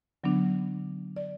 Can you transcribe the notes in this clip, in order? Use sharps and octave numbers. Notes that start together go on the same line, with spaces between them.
D3 F#3 B3 D4
D5